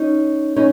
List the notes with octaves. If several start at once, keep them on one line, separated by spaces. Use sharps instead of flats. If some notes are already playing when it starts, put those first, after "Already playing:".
Already playing: C#4 D#4
C#4 D#4